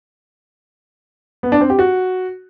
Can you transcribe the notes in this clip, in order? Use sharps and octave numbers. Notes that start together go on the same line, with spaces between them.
B3
D4
C4
G4
F#4